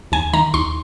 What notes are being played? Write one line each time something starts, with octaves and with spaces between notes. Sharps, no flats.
D#2 G#5
D#3 A#5
D#2 C6